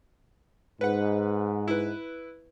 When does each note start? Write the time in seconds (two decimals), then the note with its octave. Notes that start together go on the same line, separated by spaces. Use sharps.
0.81 G#2 B4 F#5
1.68 E4 B4